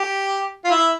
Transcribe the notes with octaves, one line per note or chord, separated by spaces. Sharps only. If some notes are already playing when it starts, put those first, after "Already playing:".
Already playing: G4
F4
E4